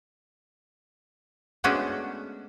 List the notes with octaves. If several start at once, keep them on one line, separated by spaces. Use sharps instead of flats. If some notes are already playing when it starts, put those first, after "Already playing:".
G#3 A3 B3 C#4 D4 F#4